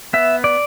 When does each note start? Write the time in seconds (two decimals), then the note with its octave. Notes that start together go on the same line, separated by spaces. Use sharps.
0.13 B3 E5
0.44 D5